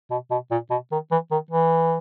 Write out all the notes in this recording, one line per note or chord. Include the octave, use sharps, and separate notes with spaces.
B2
B2
A#2
B2
D#3
E3
D#3
E3